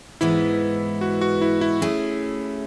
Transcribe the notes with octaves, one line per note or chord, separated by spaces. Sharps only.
G#2 E3 G#3 B3 E4
F#4
F#4
E4
E4
A3 C#4 E4 G#4